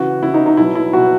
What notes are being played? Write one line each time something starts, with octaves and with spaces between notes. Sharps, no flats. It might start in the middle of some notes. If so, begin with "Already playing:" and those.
Already playing: C#3 E3 F#4
C#3 E3 E4
D#4
D#4
B2 F#3 E4
E4
B2 F#3 F#4